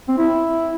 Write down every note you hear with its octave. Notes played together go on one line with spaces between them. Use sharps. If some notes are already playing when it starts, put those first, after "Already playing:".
C4
E4